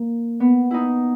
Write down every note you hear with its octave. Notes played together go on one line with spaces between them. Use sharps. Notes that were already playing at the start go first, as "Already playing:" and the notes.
Already playing: A#3
B3
D#4 E4